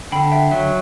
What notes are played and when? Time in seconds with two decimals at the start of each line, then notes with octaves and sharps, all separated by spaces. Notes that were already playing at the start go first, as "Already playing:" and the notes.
0.12 D3 G5 B5
0.32 E5 G5
0.51 F#3 E5